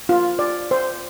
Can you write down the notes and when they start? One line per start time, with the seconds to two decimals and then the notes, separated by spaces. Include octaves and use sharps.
0.09 F4
0.39 D5
0.71 C5